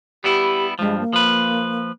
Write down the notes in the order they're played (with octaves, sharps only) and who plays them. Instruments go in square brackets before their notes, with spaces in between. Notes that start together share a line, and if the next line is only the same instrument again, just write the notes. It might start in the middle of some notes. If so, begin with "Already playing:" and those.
[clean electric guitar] G3 B3 E4 [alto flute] G4
[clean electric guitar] G2 F3 [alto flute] G#3
[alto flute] A#3
[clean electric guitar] F3 B4